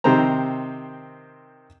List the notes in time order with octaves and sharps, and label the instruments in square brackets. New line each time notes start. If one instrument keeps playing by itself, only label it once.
[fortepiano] C3 D#3 C4 C5 A#5